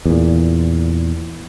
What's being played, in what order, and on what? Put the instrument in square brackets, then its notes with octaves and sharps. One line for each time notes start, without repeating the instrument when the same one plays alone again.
[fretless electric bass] E2 A#2